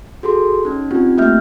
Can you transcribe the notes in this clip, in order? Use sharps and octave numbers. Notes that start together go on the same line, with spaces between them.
F#4 G#4 A4 C6
C#4 D#4
C4 D#4 F4 G4
A3 A#3 G4 E5 F6 G6